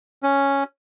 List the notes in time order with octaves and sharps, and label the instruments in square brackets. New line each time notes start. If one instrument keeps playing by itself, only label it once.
[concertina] C#4